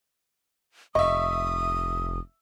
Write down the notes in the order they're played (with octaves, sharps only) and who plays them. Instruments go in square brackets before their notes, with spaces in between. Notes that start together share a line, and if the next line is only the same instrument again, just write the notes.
[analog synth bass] F1 [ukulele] D#5 [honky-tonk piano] E5 C#6 [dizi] D#6